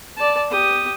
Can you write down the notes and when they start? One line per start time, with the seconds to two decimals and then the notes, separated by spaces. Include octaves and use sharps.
0.17 D5 A5
0.51 G4 D#6